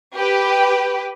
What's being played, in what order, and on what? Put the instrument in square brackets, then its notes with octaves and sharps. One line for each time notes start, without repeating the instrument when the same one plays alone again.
[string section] G4 B4